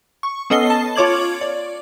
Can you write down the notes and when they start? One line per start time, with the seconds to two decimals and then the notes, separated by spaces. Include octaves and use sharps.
0.23 C#6
0.50 B3 C#4 A4 D#5 C7 G7
0.70 A5
0.96 F4 C#5 D6 G#6 F#7
1.41 D5